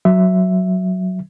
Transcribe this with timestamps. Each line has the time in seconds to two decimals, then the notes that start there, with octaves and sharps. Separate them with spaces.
0.05 F#3 E5